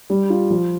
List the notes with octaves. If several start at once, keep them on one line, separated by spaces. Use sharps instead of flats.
G3
F4
F3